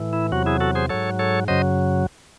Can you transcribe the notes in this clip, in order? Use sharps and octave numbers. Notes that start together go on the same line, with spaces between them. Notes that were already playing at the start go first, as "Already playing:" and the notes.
Already playing: A2 E3
E4
E2 C3 F#3 F#4
E4 G#4
F#4 A4
G#4 C5
G#2 F#3 A4 C#5
A4 C#5
F#2 C#3 F#3 C5 D#5